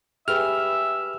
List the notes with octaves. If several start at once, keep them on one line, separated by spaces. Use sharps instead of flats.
G4 G#4 B4 E5 F6